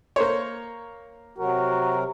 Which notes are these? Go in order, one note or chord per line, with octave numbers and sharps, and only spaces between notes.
A#3 C5 C#5
C3 F#3 F#4 A#4